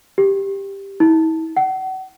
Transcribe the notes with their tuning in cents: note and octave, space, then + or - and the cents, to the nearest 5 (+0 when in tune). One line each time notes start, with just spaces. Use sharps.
G4 +10
E4 -40
F#5 +35